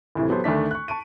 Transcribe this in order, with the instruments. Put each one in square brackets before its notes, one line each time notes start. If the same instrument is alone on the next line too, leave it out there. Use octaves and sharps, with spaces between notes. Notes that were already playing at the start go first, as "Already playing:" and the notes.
[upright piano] D2 A2 C3 E3
F#3 B3 G4 A4 C5
D2 D#3 A3 D4 B6
C#6 F#6
A5 C#6 D7 D#7